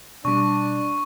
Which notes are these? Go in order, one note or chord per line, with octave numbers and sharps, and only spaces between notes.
B2 G3 D4 C#6